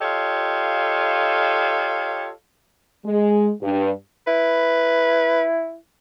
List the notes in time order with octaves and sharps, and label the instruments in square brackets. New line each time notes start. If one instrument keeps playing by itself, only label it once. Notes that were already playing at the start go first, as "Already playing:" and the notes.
[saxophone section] F4 G4 A4 C#5 D#5 F5
[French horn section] G#3
G2
[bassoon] E4 [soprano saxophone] B4